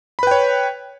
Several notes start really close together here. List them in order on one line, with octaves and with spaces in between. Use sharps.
B5 B4 G5 C#5